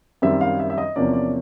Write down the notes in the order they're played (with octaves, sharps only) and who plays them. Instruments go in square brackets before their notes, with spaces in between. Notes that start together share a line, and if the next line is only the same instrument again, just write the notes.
[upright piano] F#2 D#3 G3 C4 E5
F5
E5
E5
D#5
E2 C3 F3 A#3 C#4 D5
D5